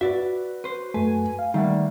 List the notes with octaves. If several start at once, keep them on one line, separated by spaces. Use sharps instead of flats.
F#4 B4 D5 E5
B4 C5
F#2 A3 B4 G#5
F5
D#3 G3 A3 A#3 D#4 E5 F#5